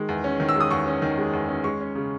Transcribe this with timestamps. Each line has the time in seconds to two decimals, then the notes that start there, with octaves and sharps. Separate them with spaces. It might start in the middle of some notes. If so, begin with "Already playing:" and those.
Already playing: D#3 G#3
0.09 E2
0.24 C#4
0.40 D#3
0.49 E6
0.56 G#3 D#6
0.71 E2 C#6
0.86 C#4
1.02 D#3
1.18 G#3
1.33 E2
1.49 C#4
1.64 G#3 C#6
1.80 C#4
1.95 C#3